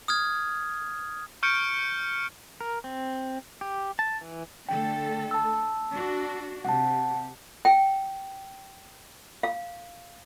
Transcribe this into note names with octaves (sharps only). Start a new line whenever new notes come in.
D#6 F6 G#6
C#6 F6 G6 C#7 D7
A#4
C4
G4
A5
E3
D3 A3 A4 G5
A5 E6
D4 F#4
C3 F#5 A5
G5
F5